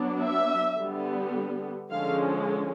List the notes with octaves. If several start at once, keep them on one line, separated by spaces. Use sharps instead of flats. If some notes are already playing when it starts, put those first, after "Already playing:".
Already playing: F#3 B3 D4
E5
D3 G3 B3
D3 F3 G#3 C#4 F5